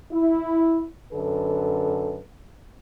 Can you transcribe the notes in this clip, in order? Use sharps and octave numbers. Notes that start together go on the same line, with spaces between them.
E4
F#2 D3 A4 B4